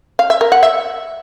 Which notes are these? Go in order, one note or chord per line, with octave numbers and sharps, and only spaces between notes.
F5
E5
A#4
F#5
E5